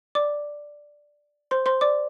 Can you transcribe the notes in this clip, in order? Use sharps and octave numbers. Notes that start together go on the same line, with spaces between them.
D5 D6
C5 C6
C5 C6
D5 D6